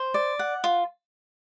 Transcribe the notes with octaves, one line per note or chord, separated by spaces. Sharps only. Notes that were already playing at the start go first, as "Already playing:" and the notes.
Already playing: C5
D5
F#5
F4